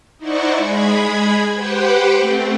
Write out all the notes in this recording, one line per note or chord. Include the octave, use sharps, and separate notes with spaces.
D#4 E4 C5 D5 F#5 C#6
G#3 G#4 B5 G#6
G4 B4 C5 F#5 G5
A3 C4